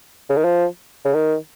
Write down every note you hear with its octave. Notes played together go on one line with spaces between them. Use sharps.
C#3
D#3
F3
C#3
D#3